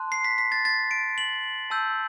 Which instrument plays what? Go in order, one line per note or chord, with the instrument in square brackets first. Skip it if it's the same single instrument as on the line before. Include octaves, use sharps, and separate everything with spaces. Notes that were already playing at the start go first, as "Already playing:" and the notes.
Already playing: [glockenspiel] A5 C6 F#6
C7
B6
B6
A6
A6
D7
F#7
A5 E6 G6